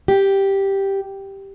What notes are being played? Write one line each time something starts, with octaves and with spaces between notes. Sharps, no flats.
G4